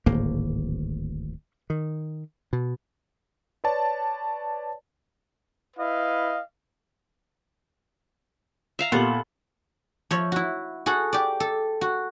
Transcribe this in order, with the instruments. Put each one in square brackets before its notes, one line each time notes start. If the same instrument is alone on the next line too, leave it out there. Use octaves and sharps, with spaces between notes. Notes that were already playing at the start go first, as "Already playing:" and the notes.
[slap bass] D1 G#1 A2 A#3
D#3
B2
[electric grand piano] B4 C#5 D5 A5
[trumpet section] E4 B4 D#5 F5
[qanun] E5 F5 A#5
[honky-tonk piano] A#2 G4 F#7 [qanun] B3 A4
[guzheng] F3 C#5 E5
E4 F#4
F#4 G#4 A4 F#5
G4 D5
A4
F#4